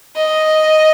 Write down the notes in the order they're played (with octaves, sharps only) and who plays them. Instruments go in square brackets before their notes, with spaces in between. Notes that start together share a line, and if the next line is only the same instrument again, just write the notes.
[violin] D#5